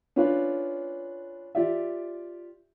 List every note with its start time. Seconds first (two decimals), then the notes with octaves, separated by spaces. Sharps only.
0.16 C#4 D4 F4 B4 F5
1.55 F4 G4 D5 E5